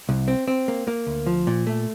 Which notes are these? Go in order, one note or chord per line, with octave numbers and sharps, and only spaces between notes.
C2
C4
C4
A#3
A#3
D2
F3
A#2
A3